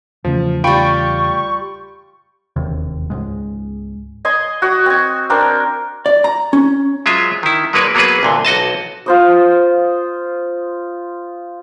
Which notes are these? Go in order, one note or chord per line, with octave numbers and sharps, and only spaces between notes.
E2 C#3 F3 A3
G3 F4 G5 B5 C#6 D7
E1 D#2 C3
C#2 G#2 G#3
D#5 G#5 C6
F#4 D#6
C4 G#5
C4 D4 A#4 C5
D5
A#5
C#4
F#3 G#3 F4 C5 E5
D#3 E4
F#3 G#3 A#3 B4 C#5 D5
F#3 A#3 B3 F#4 G#4 B4
C2 A#2 D3
B1 F#4 D#5 A5
F4 C5 D#5